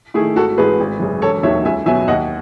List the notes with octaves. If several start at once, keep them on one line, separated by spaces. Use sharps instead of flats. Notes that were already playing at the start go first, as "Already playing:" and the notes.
D#3 A3 E4 G#4
G#1 F#4 A4
G#2 E3 G#3 G#4 B4
G#1
F#2 C#3
E1 A4 C#5
D#2 D#3 F#3 C#5 E5
C#2 E5 G#5
B2 F#3 E5 G#5
D#2 D#5 F#5